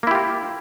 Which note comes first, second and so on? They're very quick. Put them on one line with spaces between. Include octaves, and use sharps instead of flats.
A#3 E4 G4 F4